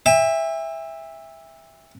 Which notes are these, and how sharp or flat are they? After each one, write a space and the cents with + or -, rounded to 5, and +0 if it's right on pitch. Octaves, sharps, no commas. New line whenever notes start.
E5 +0 G5 +45